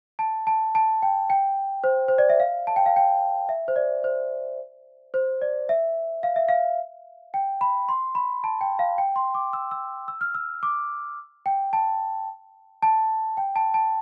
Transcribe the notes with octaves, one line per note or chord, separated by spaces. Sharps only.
A5
A5
A5
G5
G5
C5
C5
D5
E5
F5
A5
G5
F5
G5
E5
C5
D5
C5
C5
D5
E5
F5
E5
F5
G5
B5
C6
B5
A5
G5
F5
G5
C6
D6
E6
E6
E6
F6
E6
D6
G5
A5
A5
G5
A5
A5